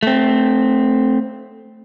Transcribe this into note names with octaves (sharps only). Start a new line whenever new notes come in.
A3 C4